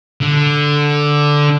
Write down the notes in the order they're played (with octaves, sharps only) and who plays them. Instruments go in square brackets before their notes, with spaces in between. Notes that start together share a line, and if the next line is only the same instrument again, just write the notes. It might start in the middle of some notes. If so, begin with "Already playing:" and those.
[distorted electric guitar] D3